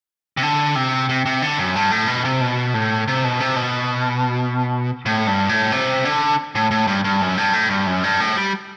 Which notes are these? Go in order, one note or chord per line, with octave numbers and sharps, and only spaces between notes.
C3
D3
C3
C3
C3
D3
F#2
G2
A2
B2
C3
B2
A2
C3
B2
C3
B2
A2
G2
A2
C3
D3
A2
A2
G2
G2
F#2
G2
A2
G2
F#2
G2
A2
G3